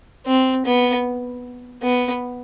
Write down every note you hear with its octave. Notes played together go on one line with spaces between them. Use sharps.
C4
B3
B3